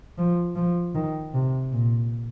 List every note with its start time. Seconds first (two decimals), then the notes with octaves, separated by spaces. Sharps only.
0.18 F3
0.56 F3
0.95 D#3
1.34 C3
1.72 A#2